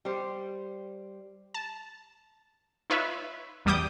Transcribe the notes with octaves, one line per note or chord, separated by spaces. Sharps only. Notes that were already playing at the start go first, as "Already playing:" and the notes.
G3 C5
A5
D#4 F4 B4 C#5 E5
A1 E2 G3 D6 D#6 G6